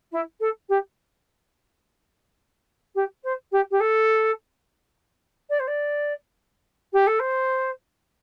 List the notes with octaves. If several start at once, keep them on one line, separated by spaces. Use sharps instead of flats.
E4
A4
G4
G4
C5
G4
G4
A4
D5
C5
D5
G4
A4
C5